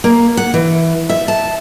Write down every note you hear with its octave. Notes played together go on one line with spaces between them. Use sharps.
A#3
F#5
E3
E5
A5